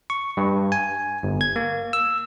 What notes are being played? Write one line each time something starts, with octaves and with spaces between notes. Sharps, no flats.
C#6
G2
G#5
G1
G#6
A#3
E6